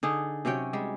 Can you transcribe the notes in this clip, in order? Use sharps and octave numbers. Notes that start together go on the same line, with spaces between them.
D3 D#4 G#4
C3 F#3 C#4 G5
G3 G#3